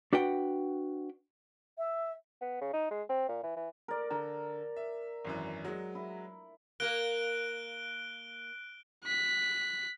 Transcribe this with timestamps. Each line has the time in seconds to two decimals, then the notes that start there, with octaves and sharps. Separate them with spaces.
0.13 D4 F#4 B4 F#5 G5
1.78 E5
2.41 B3
2.61 C#3
2.73 D#4
2.91 G#3
3.09 C4
3.29 A#2
3.43 E3
3.56 E3
3.88 A#4 D5
4.11 D3 A#5
4.76 E5
5.25 G#1 F#2 E3
5.65 F#3 G#3
5.95 E4
6.80 A#3 A#4 F#6 D7 G7
9.04 F#6 B6